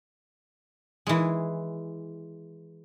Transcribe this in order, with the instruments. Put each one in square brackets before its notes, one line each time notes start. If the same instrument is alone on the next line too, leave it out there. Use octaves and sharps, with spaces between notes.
[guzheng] E3 G#3